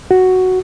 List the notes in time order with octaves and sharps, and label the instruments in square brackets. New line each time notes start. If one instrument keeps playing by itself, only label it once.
[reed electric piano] F#4